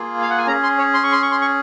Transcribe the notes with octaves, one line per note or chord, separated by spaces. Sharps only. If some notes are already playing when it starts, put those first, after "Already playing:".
Already playing: A#3 F4 G#4
F5
F#5
G#5
C#4 G#4 A#5
C6
C#5
C6
C#6
C6
C#6
C6
C#6